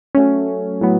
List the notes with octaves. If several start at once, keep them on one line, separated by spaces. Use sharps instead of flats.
F#3 A3 C#4
A2 F#3 B3